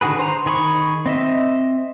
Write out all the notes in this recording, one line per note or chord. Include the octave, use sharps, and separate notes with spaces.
D3 D#3 F#4 G#4 B4
C5 A#5
D#3 G#4 B5 C#6
C4 D#5 E5